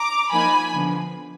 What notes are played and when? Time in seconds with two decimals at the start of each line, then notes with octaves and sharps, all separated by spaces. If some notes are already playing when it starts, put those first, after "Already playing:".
Already playing: A#5 D6
0.31 F3 A#3 D#4 G#5 B5
0.74 D3 F3 B3